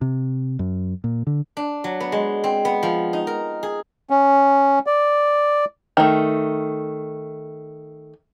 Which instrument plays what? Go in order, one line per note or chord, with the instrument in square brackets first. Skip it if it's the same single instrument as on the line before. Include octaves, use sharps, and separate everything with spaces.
[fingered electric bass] C3
F#2
A#2
D3
[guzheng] D4
F#3
B3
G#3
C4
B3
F3
D#4
A#4
G#4
[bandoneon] C#4
D5
[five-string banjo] D#3 A3